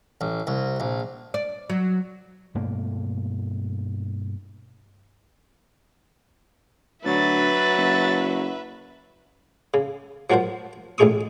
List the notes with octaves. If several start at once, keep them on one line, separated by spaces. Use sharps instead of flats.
A1
C2
A#1
D5
F#3
G2 B2 A3 A#3
D2 F#3 B4 E5 A6
F#1
C#3
F3 F#3 F#4 A#4 C5
A1 A2 D#4 G#4 C#6 D#6